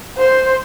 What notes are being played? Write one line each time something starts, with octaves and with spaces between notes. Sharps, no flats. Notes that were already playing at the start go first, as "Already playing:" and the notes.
C5